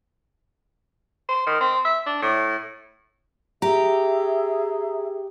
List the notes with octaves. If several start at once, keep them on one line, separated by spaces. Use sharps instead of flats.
C5
D#3
C4
E5
D4
A2
G4 G#4 E5 A#5